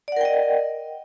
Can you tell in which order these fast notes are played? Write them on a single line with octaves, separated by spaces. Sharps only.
D5 F#5 A#4 G5 D#5